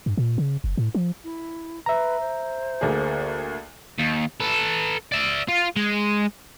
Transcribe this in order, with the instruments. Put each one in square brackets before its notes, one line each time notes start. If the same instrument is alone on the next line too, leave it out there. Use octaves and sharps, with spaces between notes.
[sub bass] G2
A#2
C#3
F#1
A2
F3
[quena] E4
[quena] B4 [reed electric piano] E5 A#5
[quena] C5
[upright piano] D2 A#3 G#4
[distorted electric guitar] D#2
A4 B4
D5 E5
F4
G#3